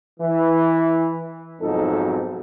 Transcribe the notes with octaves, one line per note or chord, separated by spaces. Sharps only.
E3
B1 F2 G#2 D#4 A4